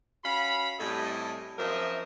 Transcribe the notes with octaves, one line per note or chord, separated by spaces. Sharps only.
C#4 F#4 F5 B5
A2 C3 G3 A4 D#5 G#5
F#2 F3 C4 A#4 D#5 E5